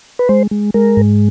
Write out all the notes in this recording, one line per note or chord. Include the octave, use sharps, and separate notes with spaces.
B4
G#3 C5
G#3
G#3 A#4
G#2